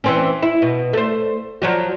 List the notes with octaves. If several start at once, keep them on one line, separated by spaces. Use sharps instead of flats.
E3 C4 C#4
E4
B2
A3 C5
F3 F#3 F#4